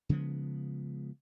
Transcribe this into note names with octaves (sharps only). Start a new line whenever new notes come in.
C#3 F3 G#3 B3